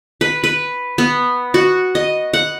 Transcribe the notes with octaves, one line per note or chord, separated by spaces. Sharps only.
B4
B4
B3
F#4
D#5
F#5